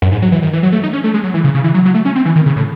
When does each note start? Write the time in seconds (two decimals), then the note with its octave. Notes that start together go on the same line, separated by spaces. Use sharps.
0.02 F#2
0.12 G#2
0.22 F#3
0.32 E3
0.42 D#3
0.53 E3
0.63 F#3
0.72 A3
0.83 D#4
0.93 C#4
1.04 A3
1.14 G#3
1.23 F#3
1.34 E3
1.44 C#3
1.54 C#3
1.64 E3
1.74 F#3
1.85 F#3
1.94 A3
2.05 C#4
2.15 C4
2.25 E3
2.36 D#3
2.46 C#3
2.56 A2